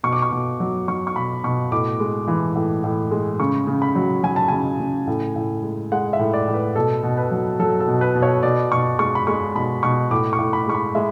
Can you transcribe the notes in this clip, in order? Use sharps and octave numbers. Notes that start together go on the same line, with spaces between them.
B2 C#6
D6
C#6
B2
F#3
F#3 C#6
C#6
B2 B5
B2 C#6
A2 D6
G#3
E3
A2
A2
G#3
C#3 C#6
C#3
B5
F#3
F#3 G#5
A5
C#3 G#5
C#3
A2
A2
G#3
G#3 F#5
E5
A2
D5
A2
B4
B2 A4
B2
B4
F#3
F#3 A4
A4
B2
B4
B2
C#5
B2 D5
B2 C#6
G#3 C#6
B5
G#3 C#6
B2 B5
B2 C#6
A2 D6
C#6
A2
B5
G#3 C#6
B5
G#3 E5